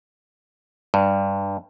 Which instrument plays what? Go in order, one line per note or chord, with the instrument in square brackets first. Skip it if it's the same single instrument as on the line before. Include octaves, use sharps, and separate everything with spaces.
[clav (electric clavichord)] G2